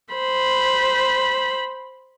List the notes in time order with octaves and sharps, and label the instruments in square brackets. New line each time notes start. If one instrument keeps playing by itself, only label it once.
[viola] C5 B5